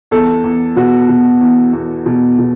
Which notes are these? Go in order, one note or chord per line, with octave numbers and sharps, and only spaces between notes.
E2 A4
E2
B2 F#4
B2
E2
E2
B2
B2